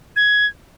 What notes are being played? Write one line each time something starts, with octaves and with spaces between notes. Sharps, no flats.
G#6